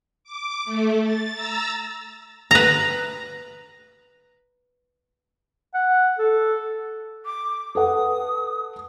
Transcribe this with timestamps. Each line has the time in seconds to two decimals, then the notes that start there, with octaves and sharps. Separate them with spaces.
0.24 D6
0.65 A3
1.03 A6
1.34 A#5 E6 A6
2.51 B4 A#5
5.74 F#5
6.19 A4
7.25 D6
7.75 A4 B4 F#5 D#6